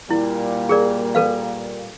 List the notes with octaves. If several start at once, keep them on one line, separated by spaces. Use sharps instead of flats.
A#2 G3 A#3 E4
G#4 A#4 D5
A4 B4 F5